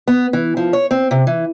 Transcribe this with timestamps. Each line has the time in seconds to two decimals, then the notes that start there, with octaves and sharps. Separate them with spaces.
0.08 B3
0.33 E3
0.57 F3
0.73 C#5
0.91 C4
1.11 C3
1.27 E3